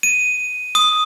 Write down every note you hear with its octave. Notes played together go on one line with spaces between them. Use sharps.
D#7
D#6